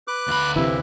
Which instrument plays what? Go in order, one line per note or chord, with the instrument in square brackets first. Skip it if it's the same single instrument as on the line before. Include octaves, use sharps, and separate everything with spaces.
[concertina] B4 D6 F#6
[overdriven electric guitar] D2 B5
[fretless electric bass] C3 E3 [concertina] E4